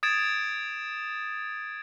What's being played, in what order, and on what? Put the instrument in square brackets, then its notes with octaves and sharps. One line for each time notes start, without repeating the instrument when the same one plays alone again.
[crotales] D#6 G#6 A6 D7 E7